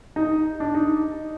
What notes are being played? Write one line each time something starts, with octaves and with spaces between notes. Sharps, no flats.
D#4
D4
D#4